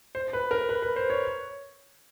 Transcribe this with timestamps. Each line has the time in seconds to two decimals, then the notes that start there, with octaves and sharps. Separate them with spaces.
0.15 C5
0.33 B4
0.51 A#4
0.69 B4
0.82 B4
0.96 C5
1.10 C#5